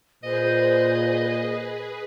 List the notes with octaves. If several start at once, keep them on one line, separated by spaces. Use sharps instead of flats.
A#2 G#4 B4 C5 D#5